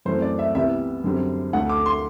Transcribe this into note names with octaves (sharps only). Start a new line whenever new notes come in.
F#2 E3 A3 C4 C5
D5
E5
C2 C3 E3 G3 B3 E5
F#2 D3 G3 C4
D2 D3 A3 F#5
D6
C6